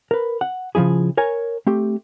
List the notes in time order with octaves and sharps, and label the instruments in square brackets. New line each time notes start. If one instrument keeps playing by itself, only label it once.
[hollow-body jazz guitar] A#4 B4
F#5
C#3 F3 G#3 E4 G#4
A#4 C#5 G#5
A3 C4 G4